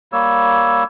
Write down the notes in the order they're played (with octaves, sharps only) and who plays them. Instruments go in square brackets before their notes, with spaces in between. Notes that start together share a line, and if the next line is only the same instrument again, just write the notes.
[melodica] G3 A#3 C#5 E6